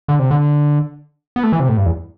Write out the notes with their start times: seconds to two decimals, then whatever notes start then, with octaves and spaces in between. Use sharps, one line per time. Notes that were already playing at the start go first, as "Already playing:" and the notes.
0.08 D3
0.19 C3
0.31 D3
1.36 B3
1.43 A3
1.52 E3
1.60 C3
1.69 A2
1.77 G2
1.86 E2